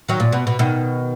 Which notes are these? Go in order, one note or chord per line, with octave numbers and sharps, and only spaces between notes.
D#3 F#3
A#2
B2
B2
B2 D#3